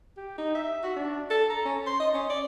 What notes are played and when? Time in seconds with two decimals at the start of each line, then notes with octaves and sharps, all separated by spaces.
0.17 G4
0.38 D#4
0.55 E5
0.83 F#4
0.96 D4
1.31 A4
1.50 A#5
1.65 C#4
1.87 C6
2.00 D#5
2.14 C#4
2.30 D5